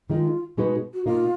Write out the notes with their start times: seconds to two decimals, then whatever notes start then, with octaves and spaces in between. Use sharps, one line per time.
0.10 D#3 G#3 D#4 F4
0.57 B2 G#3 D#4 F#4 B4
0.94 F#4
1.06 B2 A#3 D#4 F4